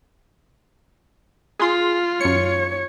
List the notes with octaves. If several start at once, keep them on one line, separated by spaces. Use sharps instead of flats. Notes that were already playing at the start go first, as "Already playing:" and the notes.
F4 G#4 C6
F#2 C#5 C#7